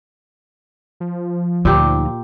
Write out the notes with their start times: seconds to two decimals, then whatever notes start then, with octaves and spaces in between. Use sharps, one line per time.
1.00 F3
1.65 D2 A#2 D#4 G4